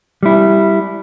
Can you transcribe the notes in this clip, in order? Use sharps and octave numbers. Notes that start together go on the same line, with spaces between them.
G3 E4